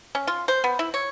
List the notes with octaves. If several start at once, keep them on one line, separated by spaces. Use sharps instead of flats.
C#4
F4
C5
B3
E4
C#5